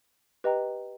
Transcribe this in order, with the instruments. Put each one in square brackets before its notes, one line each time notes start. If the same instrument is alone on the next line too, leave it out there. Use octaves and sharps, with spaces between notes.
[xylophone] G4 B4 D#5 G5 A#5